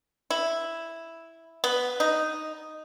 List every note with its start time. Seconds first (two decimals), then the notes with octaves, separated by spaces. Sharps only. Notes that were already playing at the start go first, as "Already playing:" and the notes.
0.30 E4
1.64 B3
2.00 D#4